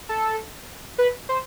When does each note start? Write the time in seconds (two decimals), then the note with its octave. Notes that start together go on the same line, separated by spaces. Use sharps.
0.09 A4
0.98 B4
1.29 C5